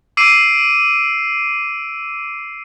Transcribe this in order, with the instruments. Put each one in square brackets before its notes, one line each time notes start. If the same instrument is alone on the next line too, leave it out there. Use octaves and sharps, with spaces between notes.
[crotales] D6 E6 C7 D7 D#7